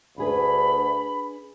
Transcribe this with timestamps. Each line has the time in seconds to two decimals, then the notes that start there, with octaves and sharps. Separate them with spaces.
0.18 D2 D4 G#4 B4 B5